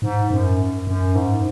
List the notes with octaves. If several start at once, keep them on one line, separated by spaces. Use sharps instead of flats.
G#2
F#2
F#2
G#2